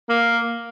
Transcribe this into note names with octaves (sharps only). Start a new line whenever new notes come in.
A#3